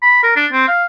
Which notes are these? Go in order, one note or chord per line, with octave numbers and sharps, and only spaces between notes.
B5
A#4
D4
C4
F5